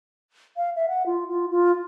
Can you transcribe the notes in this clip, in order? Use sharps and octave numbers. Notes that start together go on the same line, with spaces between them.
F5
E5
F#5
F4
F4
F4